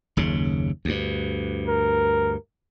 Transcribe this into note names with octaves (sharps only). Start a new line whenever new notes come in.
F#1 D#2 C#3
D2 G2
A#4